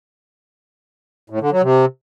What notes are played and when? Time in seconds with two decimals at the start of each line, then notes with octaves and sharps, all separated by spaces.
1.30 A2
1.40 D3
1.51 F#3
1.62 C3